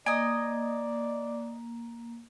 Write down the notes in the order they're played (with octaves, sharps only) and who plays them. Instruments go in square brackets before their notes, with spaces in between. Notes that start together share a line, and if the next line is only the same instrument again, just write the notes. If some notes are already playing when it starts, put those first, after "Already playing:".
[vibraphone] A#3 [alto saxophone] D5 [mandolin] D#5 G#5